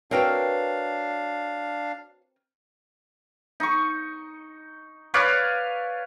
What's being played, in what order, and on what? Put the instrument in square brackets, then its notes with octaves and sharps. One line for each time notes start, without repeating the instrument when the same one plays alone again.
[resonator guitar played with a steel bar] C4 A#4 G5 [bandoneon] D4 F5 [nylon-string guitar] F#4 B4 C#5
[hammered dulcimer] D#4 C#6
B4 C#5 D5 F5